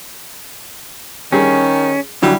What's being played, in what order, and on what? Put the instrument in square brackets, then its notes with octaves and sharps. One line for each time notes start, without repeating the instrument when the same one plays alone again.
[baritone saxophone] D#3 [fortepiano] G3 G#4 [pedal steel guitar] C#4
[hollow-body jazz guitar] F#2 D3 F#3 [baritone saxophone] G3 [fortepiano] E4